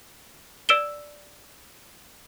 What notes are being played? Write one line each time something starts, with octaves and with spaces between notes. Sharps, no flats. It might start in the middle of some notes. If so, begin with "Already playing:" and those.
D5 E6 D7 E7 G7